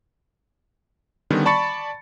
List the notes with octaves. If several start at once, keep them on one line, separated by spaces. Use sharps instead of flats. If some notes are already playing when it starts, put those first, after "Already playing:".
D3 D#3 G3 B3 C#4
D5 A5 B5 C#6 A6 C#7